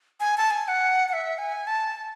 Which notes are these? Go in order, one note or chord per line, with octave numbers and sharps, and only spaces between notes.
G#5
A5
G#5
G#5
F#5
F#5
E5
G#5
A5
A5